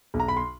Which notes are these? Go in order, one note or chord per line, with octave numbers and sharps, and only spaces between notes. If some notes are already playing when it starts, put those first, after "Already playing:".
B1
A#5
B5
C6